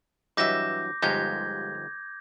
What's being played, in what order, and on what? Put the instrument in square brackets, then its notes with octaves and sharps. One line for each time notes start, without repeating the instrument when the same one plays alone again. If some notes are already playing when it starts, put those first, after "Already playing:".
[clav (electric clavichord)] G2 E3 F#3 [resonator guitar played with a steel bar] D#5 E5 [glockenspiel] D6 G6 A#6
[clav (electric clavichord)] G1 F3 D#4 [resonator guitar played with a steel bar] G#3 G4 [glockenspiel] G6 G#6